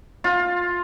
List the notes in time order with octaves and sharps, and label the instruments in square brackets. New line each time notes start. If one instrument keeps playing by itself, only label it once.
[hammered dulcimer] F4